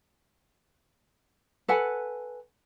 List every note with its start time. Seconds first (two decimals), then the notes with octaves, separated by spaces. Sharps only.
1.68 A4 B4 F#5 G#5